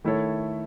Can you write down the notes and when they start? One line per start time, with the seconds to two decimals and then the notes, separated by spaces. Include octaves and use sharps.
0.04 D#3 A3 E4 A4 C#5